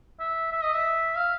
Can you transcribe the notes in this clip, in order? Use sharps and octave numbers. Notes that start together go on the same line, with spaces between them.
E5
E5
D#5
E5
F5